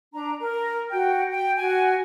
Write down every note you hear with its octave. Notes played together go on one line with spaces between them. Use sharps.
D4 A#5
A#4
F#4 G5
G5
F#4 G#5